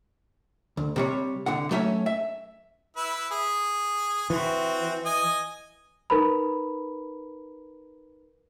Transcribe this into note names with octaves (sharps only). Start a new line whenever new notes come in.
D2
C3 G3 C#5
C2 D3 F#5
F#3 A3 C#4 C#5 E5
E5
E4 B4 E5
G#4
E3 C4 F#4
D#5 G#5 D#6
D#4 A#4 B4 A#5 B5